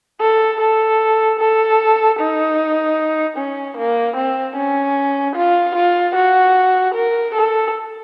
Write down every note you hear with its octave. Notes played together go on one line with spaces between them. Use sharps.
A4
A4
A4
D#4
C#4
A#3
C4
C#4
F4
F4
F#4
A#4
A4